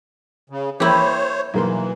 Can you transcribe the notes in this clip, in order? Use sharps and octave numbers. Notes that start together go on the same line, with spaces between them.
C#3
E3 A#3 E4 G4 C5 C#5
B1 E3 A#3 C6